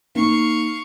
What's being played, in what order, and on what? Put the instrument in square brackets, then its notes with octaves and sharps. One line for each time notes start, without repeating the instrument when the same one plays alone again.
[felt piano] A#3 D#4 [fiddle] F5 C#6